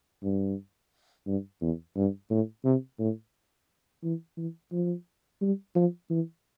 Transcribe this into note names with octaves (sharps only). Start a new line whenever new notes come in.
G2
G2
E2
G2
A2
C3
A2
E3
E3
F3
G3
F3
E3